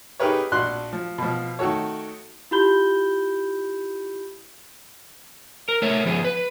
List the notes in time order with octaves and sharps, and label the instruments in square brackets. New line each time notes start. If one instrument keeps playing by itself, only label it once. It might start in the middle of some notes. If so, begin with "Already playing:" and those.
[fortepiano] D#4 G4 G#4 A#4 B4 C#5
A#1 D4 F#4 C6 F#6
F3
B2 F3
D#3 A3 F#4 A4 C#5
[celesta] E4 F4 G4 B5 G6 G7
[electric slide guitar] A#4
A3 A#4 C#5 E5
F3 B3 G#4
B4